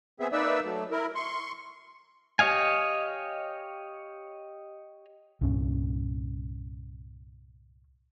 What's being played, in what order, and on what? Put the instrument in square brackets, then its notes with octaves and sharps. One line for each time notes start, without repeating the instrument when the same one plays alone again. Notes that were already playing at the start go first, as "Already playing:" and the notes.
[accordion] B3 C4 G#4 E5
A#3 D#4 B4 D5 E5 E6
F#3 A3
E4 A#4
C6 C#6
[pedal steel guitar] G4 C#5 D#5 F5 G#5
[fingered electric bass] C2 G2 A#2 C#4